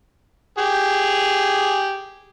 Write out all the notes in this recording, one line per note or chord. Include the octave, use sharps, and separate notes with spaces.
G4 G#4